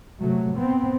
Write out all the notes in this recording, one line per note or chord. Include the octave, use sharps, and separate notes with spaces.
C3 F#3 A3
B3 C4